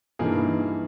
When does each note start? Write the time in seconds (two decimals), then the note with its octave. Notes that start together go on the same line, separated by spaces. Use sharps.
0.19 G2 E3 A#3 D#4 G#4